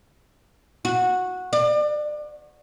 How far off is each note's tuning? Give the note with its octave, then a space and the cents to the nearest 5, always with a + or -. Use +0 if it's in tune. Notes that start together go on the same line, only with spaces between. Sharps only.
F#4 -15
D5 +30